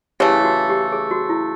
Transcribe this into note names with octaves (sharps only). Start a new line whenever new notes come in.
C#3 E3 A3 G4
F#4
G4
G#4
F#4
E4